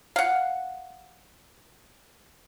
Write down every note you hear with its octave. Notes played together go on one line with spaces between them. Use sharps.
F5 F#5